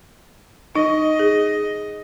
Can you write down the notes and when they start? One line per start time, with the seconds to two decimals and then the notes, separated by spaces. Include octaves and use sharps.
0.76 D#4 D#5
1.19 G#4